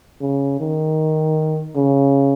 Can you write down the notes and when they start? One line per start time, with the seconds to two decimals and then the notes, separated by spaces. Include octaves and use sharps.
0.21 C#3
0.60 D#3
1.75 C#3